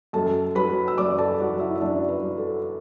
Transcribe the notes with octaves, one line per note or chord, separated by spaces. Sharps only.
F#2 A4 A5
F#3 B4 B5
E6
F#2 D5 D6
A4 A5
F#3 F#4 F#5
E4 E5
E5
F#2 D4 D5
B4
F#3
A4